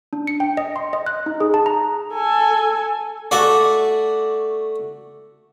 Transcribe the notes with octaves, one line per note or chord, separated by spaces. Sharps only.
D4
C#7
G5
D#5
C6
D#5
F#6
D#4
G#4
A5
A#5
A4 G#5
A3 F#4 D5